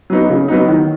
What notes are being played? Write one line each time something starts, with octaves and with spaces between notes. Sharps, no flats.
F#3 B3 D#4
C#3
F#3 B3 D#4
D#3